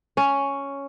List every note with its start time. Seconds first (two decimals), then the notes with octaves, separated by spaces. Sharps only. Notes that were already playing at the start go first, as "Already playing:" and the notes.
0.17 C#4